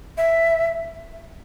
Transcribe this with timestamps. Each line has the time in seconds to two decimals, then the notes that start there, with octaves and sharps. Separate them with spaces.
0.17 E5